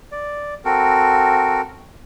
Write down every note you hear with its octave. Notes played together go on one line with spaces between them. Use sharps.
D5
C4 F#4 A4 A#4